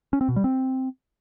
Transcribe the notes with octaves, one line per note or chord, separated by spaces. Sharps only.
C#4
C4
B2
G3
C4